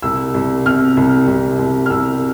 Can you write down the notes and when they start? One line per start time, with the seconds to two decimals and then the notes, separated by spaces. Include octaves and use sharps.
0.02 C2 E6
0.34 C2
0.66 C3 F6
0.97 C2
1.27 C2
1.59 C2
1.86 F6
1.90 C2 E6